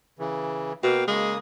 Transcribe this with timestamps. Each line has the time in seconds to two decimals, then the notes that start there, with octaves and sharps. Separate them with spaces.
0.19 C#3 E3
0.83 B2 A#3 F5 G5
1.08 C#3 G#3 A#3 D#6